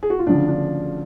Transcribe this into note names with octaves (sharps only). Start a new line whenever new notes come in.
G#4
F#4
F4
D2 C#3 F3 D4
D4